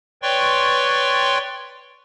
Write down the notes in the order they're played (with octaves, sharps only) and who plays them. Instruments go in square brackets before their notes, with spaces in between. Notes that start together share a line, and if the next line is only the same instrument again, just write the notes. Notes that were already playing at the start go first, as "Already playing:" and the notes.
[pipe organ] B4 C#5 D5 G5 C6 C#6